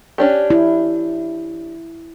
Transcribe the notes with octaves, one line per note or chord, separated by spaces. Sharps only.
C#4 D4 G4
E4